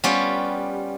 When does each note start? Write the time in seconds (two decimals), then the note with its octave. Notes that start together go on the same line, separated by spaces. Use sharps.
0.04 G3 B3 C#4 F4 G4